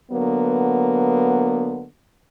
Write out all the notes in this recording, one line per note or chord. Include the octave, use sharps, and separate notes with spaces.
D3 F#3 A#3 B3